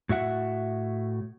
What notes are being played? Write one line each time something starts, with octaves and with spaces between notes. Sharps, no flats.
A2 F#4 E5 F#5